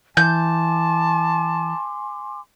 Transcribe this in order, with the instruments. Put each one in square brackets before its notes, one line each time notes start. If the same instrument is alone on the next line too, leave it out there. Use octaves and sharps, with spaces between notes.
[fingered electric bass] E3 [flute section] G#5 C6 D6 [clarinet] A5 [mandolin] G6